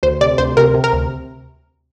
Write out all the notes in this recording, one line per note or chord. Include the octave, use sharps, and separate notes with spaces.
D2 C5
C3 D5
D2 C5
C3 A#4
C3
A#4
D2